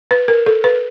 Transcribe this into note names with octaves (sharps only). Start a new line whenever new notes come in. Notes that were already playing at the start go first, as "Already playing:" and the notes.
B4
A#4
A4
B4